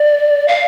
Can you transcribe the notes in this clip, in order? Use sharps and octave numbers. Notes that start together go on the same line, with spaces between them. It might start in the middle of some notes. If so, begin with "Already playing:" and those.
Already playing: D5
F5